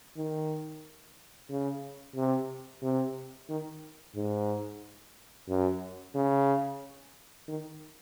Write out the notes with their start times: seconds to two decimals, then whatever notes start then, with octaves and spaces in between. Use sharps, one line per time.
0.17 D#3
1.50 C#3
2.16 C3
2.82 C3
3.49 D#3
4.16 G#2
5.48 F#2
6.15 C#3
7.48 D#3